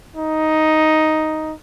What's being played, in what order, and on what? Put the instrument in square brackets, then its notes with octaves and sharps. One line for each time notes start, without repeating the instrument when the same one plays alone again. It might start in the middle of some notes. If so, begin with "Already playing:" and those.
[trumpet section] D#4